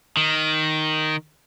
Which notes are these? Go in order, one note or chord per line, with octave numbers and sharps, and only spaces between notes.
D#3